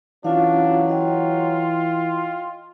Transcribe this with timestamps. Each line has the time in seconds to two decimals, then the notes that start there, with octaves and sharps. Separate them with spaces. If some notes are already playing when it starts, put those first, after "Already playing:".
0.25 E3 F#3 C#4 D4 F4 F5
0.89 F4 D#5 G5